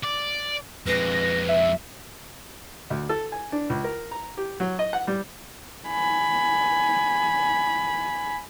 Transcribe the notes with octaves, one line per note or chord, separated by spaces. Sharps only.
D5
F2 G#3 B4 A#6
E5
D2
A4
G#5
D4
C#2
A#4
A#5
G4
F#3
D#5
F#5
G3
G#5 B5